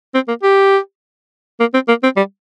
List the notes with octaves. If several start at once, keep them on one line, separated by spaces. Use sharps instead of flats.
C4
A#3
G4
A#3
C4
A#3
C4
G3